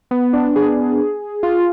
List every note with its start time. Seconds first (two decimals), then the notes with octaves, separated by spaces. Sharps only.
0.11 B3
0.33 D4
0.56 G#4
1.43 F4